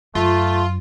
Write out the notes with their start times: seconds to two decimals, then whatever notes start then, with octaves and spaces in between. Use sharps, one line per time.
0.15 F#2 A3 F4